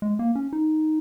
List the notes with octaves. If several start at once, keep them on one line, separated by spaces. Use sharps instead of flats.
G#3
A#3
C#4
D#4